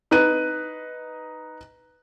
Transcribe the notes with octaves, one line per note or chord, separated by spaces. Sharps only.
D#4 B4 F#6 D#7